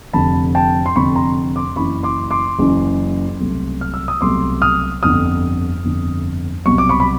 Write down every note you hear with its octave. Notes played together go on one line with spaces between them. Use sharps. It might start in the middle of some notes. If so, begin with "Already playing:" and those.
F1 F2 D3 A5 B5
G5 A5
C6
F1 F2 D3 B5 C#6
A#5 C6
C6 D6
F#1 F#2 C#3 E3 B5 C#6
C6 D6
C6 D6
F#1 F#2 C#3 E3
C2 B2 F#3 A3
F6
E6
D#6
C2 B2 F#3 A3 C6 D6
D#6 F6
G1 F2 D3 D#6 F6
G1 F2 D3
C2 B2 F#3 C#6
D6
B5 C#6
B5